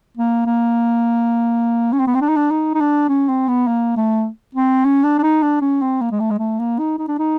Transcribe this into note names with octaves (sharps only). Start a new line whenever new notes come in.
A#3
A#3
C#4
C4
B3
C4
D4
D#4
D4
D#4
D#4
D4
C#4
C4
B3
A#3
A3
C4
C#4
D4
D4
D#4
D4
C#4
C4
A#3
G#3
A3
G#3
A3
A#3
D#4
D#4
D4
D#4